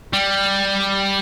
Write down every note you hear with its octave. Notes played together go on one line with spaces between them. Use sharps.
G3